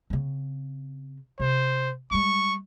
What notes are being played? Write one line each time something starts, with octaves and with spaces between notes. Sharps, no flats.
C#3 C4
C3 C5
G3 G#3 C#6